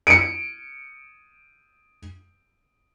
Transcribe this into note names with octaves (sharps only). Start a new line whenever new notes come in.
C#7 D7